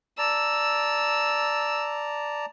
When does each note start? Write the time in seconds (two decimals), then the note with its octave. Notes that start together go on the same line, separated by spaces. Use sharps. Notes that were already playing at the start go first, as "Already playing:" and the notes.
0.18 D5 A5 A#5 E6